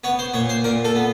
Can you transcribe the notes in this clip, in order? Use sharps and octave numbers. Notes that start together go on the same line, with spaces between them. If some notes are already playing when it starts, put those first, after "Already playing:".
B3 C#5
C5
A#2 C#5
C5
A#2 A#4
A4
B3